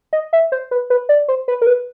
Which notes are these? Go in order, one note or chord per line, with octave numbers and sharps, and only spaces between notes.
D#5
E5
C5
B4
B4
D5
C5
B4
A#4
B4